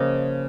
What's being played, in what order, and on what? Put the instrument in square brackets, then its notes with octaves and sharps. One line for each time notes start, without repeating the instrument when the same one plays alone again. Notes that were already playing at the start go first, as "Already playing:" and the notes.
Already playing: [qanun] C#3 F3 A#3 D#5